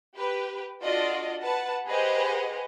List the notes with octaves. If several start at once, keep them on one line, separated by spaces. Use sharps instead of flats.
G4 B4
D4 F4 F#4 A4 D5 D#5
B4 F#5 A5
G4 G#4 B4 C5 D#5 F#5